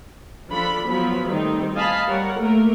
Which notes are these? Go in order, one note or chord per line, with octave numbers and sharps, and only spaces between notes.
F3 D4 A4 B5
F3 F#3 B3 B5
D#3 G3 A3 C4 D#4
D#5 F5 G#5 A5 B5
G3 A#4 C#5 F#5
A3 A#3 A#4